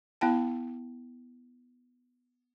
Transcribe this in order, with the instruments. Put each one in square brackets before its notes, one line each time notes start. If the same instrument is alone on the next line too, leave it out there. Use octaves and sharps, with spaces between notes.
[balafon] B3 E4 G5 A5